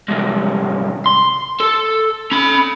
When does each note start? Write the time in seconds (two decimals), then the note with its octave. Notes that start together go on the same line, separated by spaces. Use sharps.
0.09 C2 G#2
1.06 C6
1.60 A4
2.32 C#4 B5